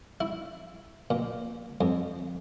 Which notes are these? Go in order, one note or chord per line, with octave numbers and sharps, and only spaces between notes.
E4
A#2
F2